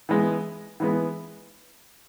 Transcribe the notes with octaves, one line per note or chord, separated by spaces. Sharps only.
E3 G#3 B3
E3 G#3 B3